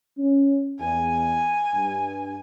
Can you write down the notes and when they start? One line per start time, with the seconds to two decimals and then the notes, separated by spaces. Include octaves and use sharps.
0.18 C#4
0.80 E2 G#5
1.74 G2